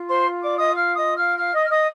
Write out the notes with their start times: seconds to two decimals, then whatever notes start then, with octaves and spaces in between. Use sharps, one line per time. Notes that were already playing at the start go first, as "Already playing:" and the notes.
Already playing: F4
0.09 C5 C6
0.42 D5 D6
0.57 D#5 D#6
0.74 F5 F6
0.95 D#5 D#6
1.17 F5 F6
1.38 F5 F6
1.54 D#5 D#6
1.64 F6
1.70 D#5 D#6